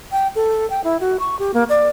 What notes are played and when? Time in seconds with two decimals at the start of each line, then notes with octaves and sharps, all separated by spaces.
0.12 G5
0.36 A4
0.70 G5
0.84 E4
1.00 F#4
1.20 C#6
1.39 G4
1.54 A#3
1.69 D5